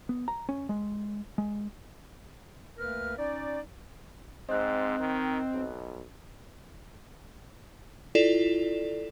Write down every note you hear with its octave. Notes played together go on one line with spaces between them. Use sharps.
B3
A#5
C#4
G#3
G#3
D2 A#3 A#4 B4 F6
C#4 D#4 D5
G#2 C4 D#5 F#6
D#3
B1
E4 F4 A4 D5